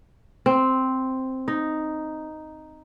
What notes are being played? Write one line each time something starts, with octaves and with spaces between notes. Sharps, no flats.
C4
D#4